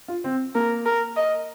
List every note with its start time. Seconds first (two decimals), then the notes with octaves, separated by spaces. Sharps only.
0.08 F4
0.24 C4
0.55 A#3 A#4
0.86 A#4
1.17 D#5